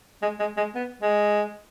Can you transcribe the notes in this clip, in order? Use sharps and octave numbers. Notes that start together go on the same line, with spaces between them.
G#3
G#3
G#3
B3
G#3